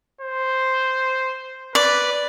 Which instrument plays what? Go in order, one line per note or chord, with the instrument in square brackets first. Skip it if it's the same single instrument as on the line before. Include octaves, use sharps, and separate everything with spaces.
[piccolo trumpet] C5
[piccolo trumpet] B4 [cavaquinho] D5